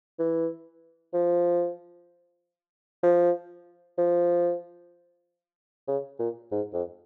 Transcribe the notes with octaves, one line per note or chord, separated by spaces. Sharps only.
E3
F3
F3
F3
C#3
A#2
G#2
F2